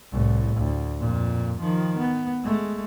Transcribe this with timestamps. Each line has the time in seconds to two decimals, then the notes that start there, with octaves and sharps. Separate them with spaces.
0.11 C2 A2
0.57 D2
1.00 F2 A#2
1.60 D#3 F3
1.98 B3
2.44 G#3 A3